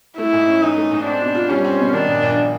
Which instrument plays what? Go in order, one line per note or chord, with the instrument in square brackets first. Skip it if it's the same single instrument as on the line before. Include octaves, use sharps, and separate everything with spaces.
[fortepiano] A3 [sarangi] E4
[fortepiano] G#2
C#4
[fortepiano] E3 [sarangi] D#4
[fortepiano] A3
G#2
[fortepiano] C4 [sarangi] D4
[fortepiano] B2
F4
[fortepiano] G3 [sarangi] C#4
[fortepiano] C4
B2
[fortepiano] D#3 [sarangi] D4
[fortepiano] A#1
A#1